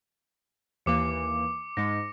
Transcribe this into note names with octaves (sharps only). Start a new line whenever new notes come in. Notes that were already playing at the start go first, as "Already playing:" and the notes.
D#2 E3 A#3 D6 C#7
G#2 G#3 A#6 C#7